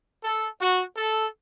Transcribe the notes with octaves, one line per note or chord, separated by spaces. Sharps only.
A4
F#4
A4